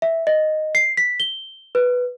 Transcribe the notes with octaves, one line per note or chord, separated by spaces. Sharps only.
E5
D#5
C7
B6
G7
B4